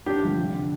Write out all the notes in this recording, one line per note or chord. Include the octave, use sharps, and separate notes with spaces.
A1 D4 G4
G2 D3 F3
F1
D3